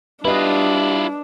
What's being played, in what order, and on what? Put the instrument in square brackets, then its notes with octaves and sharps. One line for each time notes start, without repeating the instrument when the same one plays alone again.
[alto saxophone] G3 [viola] D4 [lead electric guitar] E4 F4 [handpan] B4 D#5